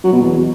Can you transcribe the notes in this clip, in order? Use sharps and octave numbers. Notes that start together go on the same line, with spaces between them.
F#3
B2
E2